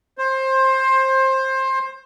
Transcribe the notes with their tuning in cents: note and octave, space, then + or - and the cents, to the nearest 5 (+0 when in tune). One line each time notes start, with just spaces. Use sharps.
C5 +20